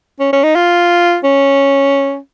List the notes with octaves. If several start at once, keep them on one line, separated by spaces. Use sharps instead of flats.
C#4
C#4
D#4
F4
C#4